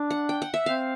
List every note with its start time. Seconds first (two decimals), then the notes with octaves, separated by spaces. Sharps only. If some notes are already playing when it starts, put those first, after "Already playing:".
Already playing: D4
0.10 F#5
0.29 G5
0.42 F#5
0.54 E5
0.66 C4 F5